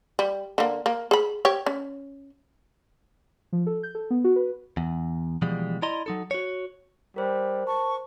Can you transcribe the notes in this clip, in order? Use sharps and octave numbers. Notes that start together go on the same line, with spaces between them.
G3
D3 A#3
A#3
G#4 B5
G4 C#5
C#4
F3
A4
G6
A4
B3
F#4
B4
E2
B2 E3 F3 G3 G#3
E4 D5 D#5 A#5 C6
F#3 D#4 A4
F#4 C#5
G3 A#4 C5
A5 C#6